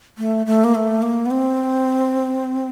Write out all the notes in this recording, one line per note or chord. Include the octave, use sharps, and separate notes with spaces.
A3
A3
A#3
A3
A#3
B3
C4